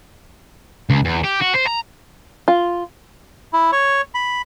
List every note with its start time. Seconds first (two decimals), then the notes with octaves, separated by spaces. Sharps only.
0.90 C#2
1.05 E2
1.24 G4
1.42 F#4
1.56 C5
1.67 A#5
2.48 F4
3.53 E4
3.72 C#5
4.15 B5